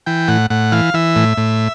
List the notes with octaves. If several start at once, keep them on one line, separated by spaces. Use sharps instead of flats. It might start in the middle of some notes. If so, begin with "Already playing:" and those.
E3 G5
A2 F#5
A2 F#5
E3 F5
E3 E5
A2
A2